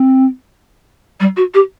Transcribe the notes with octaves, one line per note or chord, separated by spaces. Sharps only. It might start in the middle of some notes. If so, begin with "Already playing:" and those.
Already playing: C4
G3
F#4
G4